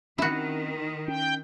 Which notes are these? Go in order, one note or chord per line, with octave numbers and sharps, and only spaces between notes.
D#3 C4 C#4 E4 F#4
C#4 G5